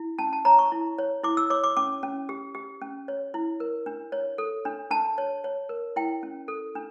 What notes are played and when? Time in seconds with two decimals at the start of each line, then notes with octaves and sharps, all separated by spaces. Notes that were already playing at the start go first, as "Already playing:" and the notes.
Already playing: E4
0.19 C#4 A5
0.33 A5
0.45 C#5 A#5
0.59 C#6
0.72 E4
0.98 C#5
1.23 E4 D6
1.37 E6
1.50 C#5 D6
1.64 D6
1.77 C#4 D6
2.03 C#4
2.29 G4
2.55 G4
2.82 C#4
3.08 C#5
3.34 E4
3.60 A#4
3.86 D4
4.12 C#5
4.38 A4
4.65 D4
4.91 D4 A5
5.18 C#5
5.44 C#5
5.69 A#4
5.96 E4 G5
6.23 C#4
6.48 A4
6.75 D4